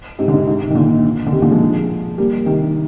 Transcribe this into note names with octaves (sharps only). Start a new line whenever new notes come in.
G#2 C3
D3
G#2 C3
G#2 C3
D#3
A#2 D3
D3
C3 D#3
A#2 D3
F3 G#3
G3 A#3
C3 D#3